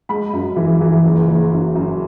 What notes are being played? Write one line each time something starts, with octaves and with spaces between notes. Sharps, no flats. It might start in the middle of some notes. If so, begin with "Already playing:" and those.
G#3 B5
F#2
E3
E3
F#1
F#1
F#2
F#2